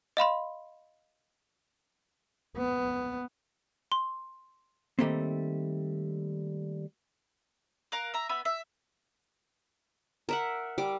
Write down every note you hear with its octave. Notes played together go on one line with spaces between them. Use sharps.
D#5 F5 B5 C6
B3
C6
D#3 G3 A3 A#3 C4
A#4 F5 F#6
E5 A#5
B3 E5 B5
E5
A#4 E5 F#5
G3 D6